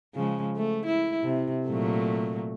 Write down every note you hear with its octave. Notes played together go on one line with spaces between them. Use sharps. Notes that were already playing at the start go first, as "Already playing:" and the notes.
C#3 F3 G#3
A3
E4
C3
A#2 F#3 A3